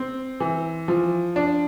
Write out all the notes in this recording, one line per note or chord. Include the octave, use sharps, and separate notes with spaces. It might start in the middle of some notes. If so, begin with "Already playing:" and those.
Already playing: C4
E3
F3
D4